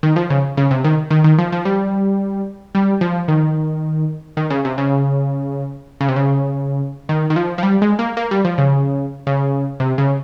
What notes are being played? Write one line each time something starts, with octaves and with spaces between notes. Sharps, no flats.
D#3
F3
C#3
C#3
C3
D#3
D#3
D#3
F3
F3
G3
G3
F3
D#3
D#3
C#3
C3
C#3
C#3
C3
C#3
D#3
D#3
F3
F3
G3
G#3
A#3
A#3
G3
F3
C#3
C#3
C3
C#3